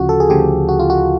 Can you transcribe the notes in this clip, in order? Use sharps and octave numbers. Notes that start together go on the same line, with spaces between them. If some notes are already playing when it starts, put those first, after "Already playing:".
Already playing: D2 C#3 F3 F4 F#4
A4
G#4
D2 C#3 F3 G4
F#4
F4
F#4